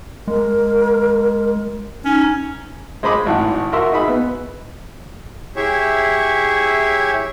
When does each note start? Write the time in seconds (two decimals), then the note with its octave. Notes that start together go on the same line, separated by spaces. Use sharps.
0.28 G#3 A#4
2.05 C#4 D#4
3.03 G#3 C5 D#5 B5 D6
3.26 G#1 A2 F#5
3.73 F#4 A#4 E5 C6 C#6 E6
3.92 D#4 G#4 E5 B5
4.08 B3
5.56 E4 G4 G#4 C#5 E5